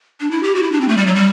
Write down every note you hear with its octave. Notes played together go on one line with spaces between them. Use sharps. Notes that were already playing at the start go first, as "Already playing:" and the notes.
D4
E4
G4
F#4
E4
D4
C4
A3
G3
F#3
G3